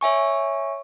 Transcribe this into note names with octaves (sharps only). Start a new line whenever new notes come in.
C#5 E5 G#5 C#6